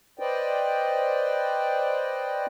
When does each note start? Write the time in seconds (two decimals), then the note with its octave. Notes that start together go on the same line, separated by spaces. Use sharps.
0.19 B4 C5 D5 D#5 G5